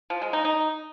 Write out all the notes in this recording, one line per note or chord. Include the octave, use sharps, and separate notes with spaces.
F3
G#3
D#4
D#4